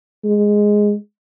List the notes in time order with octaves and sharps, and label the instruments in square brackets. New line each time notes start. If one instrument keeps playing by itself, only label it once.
[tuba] G#3